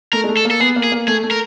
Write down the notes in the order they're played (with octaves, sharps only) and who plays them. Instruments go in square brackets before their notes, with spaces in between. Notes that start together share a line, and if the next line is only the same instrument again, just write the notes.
[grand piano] A3 [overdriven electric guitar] A#4
[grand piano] G#3
A3
[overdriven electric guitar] A4
[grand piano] A#3
[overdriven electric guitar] A4
[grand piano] B3 [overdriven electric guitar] G#4
[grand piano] A#3
[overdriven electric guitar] G#4
[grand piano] A#3
[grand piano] A3 [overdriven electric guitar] G#4
[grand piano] A3
[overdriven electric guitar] A#4